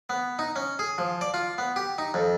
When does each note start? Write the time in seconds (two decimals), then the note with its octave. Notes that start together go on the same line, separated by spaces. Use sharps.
0.10 B3
0.39 D#4
0.56 C#4
0.79 G#4
0.98 F3
1.21 D5
1.34 F4
1.58 B3
1.76 G4
1.98 D#4
2.14 F2